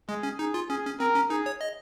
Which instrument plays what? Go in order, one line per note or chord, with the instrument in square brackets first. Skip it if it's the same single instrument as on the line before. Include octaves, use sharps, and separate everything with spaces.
[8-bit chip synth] G#3 [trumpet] G#4
[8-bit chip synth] C#4
[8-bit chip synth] D#4 [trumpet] G#4
[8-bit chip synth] F4
[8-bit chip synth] C#4 [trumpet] G#4
[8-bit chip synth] C#4
[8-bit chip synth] C4 [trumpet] A#4
[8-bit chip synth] C#4
[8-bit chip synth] D#4 [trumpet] G#4
[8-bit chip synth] C#5
D#5